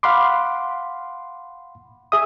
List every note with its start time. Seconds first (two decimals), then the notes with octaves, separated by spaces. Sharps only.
0.03 F5 F#5 B5 C6 D6
2.12 G#4 E5 D#6